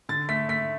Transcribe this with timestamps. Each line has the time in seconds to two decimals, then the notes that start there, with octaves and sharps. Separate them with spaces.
0.09 D3 A6
0.29 A3 B6
0.49 A3 B6